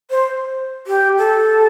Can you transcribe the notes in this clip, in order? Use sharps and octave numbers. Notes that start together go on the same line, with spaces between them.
C5
G4
A4